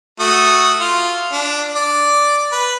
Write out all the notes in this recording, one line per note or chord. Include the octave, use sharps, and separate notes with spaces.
A3 F#4 D#6
F4
D4
D5
B4